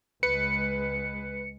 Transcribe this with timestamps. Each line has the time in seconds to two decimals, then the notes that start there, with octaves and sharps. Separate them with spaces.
0.23 C#2 G#3 B4 C#7